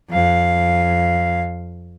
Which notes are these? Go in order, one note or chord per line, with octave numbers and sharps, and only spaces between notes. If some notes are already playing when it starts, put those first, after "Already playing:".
F2 F5